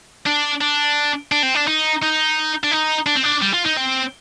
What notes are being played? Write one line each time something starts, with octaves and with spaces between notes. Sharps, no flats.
D4
D4
D4
C4
D4
D#4
D#4
D4
D#4
D4
C4
D4
G3
F4
D#4
C4